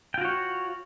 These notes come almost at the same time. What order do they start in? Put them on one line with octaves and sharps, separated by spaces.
G5 F4 F#4 C#5